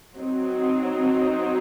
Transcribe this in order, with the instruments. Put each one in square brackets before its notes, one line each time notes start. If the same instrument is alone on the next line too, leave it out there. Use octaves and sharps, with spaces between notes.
[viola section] F#3 C4 D#4